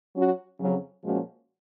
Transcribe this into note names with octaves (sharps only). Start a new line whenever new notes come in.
F#3 C#4 F#4
F2 C#3 F#3 C#4
A#2 F3 G#3 C#4 F#4